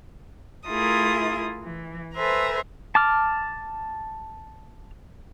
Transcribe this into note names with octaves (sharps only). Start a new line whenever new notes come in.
A3 E4 F4 G#4 A#4 D#6
E3
A4 B4 C5 E5 G#5 A#5
A5 D6 F6